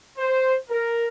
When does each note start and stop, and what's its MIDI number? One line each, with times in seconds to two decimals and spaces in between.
0.18 0.55 72
0.70 1.06 70